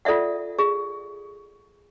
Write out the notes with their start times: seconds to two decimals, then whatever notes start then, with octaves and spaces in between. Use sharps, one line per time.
0.05 F4 A4 D5 E5 F#5
0.59 G#4